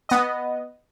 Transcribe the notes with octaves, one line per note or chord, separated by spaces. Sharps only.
B3 D#5